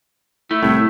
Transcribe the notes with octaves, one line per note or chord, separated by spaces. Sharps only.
A3 E4
C2 A2